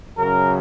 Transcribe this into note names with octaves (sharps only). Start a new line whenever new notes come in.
F#2 C#3 F#3 A#4